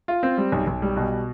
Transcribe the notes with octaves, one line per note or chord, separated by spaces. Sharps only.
F4
C4
G3
B1
B1
G3
B2